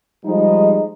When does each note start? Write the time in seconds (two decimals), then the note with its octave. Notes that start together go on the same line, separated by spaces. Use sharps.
0.24 F3 G3 G#3 D#4